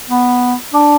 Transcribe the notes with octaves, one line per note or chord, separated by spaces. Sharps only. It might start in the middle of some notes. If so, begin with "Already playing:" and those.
B3
D4